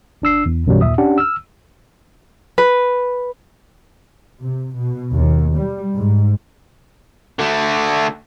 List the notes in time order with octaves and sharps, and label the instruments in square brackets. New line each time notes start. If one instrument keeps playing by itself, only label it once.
[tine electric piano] G1 D4 E6 C7
E2
B1 F#2 B2 E3 F#3 G3
D#2 A#2 E5 D#6
C#4 D4 G4 F#5
E6 F6
[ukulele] B4
[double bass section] C3
B2
D#2
G3
G#2
[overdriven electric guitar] D3 A3